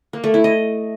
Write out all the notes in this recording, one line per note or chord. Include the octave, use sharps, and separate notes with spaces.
A#3
A3
E4
D#5